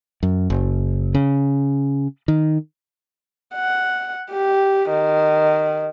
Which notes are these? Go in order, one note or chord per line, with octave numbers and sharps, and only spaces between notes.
F#2
F#1
C#3
D#3
F#5
G4
D#3